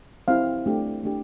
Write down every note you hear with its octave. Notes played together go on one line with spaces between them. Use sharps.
C4 E4 G4 F5
A3 D4 G4
A3 D4 G4